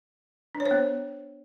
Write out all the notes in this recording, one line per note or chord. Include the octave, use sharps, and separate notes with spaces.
D4
C#5
C5
B3